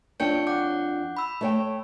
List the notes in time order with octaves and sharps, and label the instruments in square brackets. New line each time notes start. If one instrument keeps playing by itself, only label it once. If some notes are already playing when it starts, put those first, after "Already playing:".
[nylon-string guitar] F2 D4 G5 [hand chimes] C#5 G6 C#7
[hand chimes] F#5 D6 G6
B5 E6
[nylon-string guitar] A3 C#5 G5